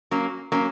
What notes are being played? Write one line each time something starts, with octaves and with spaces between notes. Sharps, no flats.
F#3 A#3 C#4
F#3 A#3 C#4